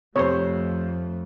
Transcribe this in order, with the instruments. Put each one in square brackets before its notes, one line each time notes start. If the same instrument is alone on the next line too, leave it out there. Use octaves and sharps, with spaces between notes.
[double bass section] F2 A3 [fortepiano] C3 C5 [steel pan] C#5